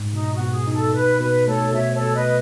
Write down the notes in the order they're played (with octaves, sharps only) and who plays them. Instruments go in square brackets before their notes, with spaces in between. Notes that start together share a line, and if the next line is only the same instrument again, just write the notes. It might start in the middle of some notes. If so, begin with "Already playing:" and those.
Already playing: [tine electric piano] G#2
[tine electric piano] B2 [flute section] D#4
[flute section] F#4
[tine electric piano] B2
[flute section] G#4
[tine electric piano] D#4
[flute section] A4
[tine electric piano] B2 [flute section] B4
[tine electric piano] B2 [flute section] B4
[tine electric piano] A3 [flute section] A4 C#5
[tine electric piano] B2 [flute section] C#5 E5
[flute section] A4 C#5
[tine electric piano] B2
[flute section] B4 D#5